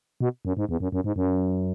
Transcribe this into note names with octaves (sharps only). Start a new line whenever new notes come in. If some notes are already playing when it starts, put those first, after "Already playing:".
B2
F#2
G#2
E2
F#2
F#2
G#2
F#2